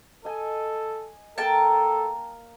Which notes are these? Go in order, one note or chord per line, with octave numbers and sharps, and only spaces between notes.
A4 D#5 G#5
A#3 A4 G5 A5 A#5